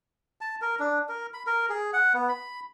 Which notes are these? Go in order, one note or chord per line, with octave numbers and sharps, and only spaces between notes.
A5
A#4
D4
A#4
B5
A#4
G#4
F#5
B3
B5